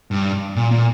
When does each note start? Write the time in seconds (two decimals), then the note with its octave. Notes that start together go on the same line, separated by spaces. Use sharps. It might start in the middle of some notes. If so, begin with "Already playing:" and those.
0.11 G2
0.56 A#2
0.71 A#2